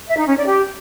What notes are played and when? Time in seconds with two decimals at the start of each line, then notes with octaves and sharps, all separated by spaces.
0.08 E5
0.18 D#4
0.27 C#4
0.37 D5
0.47 G4